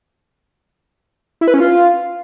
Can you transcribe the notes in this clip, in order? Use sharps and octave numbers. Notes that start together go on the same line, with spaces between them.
E4
B4
C#4
F4